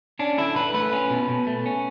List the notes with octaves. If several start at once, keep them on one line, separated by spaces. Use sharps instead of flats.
C#4 D4
D3 E4
D3 B4
A3 B4
C#4
B2
B2
A3
C#4